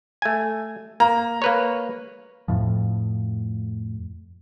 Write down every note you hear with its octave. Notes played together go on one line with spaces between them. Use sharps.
A3 G#5
A#3 A#5
A#3 B4 C#5
F2 A2 F3